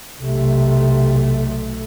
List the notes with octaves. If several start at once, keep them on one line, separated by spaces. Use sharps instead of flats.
B1 C3 A3